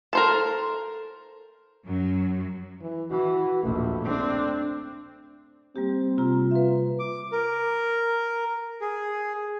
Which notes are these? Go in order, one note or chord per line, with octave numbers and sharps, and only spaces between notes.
A4 A#4 C5 A5
F#2 F#3
E3
E3 F#4
A#1 D#2 A3
C4 D4
G3 A#3 C4 G4
C3 F4 A#5
F4 B4 E5
D6
A#4
G#4